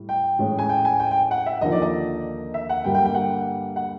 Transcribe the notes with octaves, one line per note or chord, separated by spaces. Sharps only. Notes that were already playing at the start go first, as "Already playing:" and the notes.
Already playing: A2 G3
G5
A2 E3 G#3 C#4
G#5
G5
G#5
G5
G5
F#5
E5
D#2 D3 F3 A#3 D#4 D#5
D5
D#5
E5
F#5
G2 D3 G3 A#3 G5
G5
G5
F#5
F#5